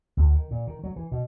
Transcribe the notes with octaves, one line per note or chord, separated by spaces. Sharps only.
D2
D#3
A#2
D#3
F#3
E3
B2